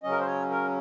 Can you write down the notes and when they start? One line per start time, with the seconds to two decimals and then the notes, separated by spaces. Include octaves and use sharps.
0.03 C#3 F#3 C#4 D#5
0.11 A#4
0.19 C5
0.26 C#5
0.50 A#4